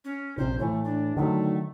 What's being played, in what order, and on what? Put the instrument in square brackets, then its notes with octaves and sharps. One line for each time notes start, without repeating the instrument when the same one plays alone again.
[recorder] C#4
[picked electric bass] A#1 C3 [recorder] C5
[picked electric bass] A2 E3 [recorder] A3
[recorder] D4
[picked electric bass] D3 D#3 F#3 [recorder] A3